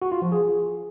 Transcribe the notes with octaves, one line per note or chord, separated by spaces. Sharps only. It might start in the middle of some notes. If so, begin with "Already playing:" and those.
F#4
F4
F3
G#4